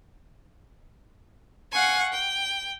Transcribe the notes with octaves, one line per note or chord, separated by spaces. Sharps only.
F5 F#5 G#5 C#6
G5